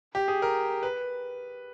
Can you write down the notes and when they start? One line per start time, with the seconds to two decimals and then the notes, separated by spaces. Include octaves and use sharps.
0.15 G4
0.28 G#4
0.42 A#4
0.83 B4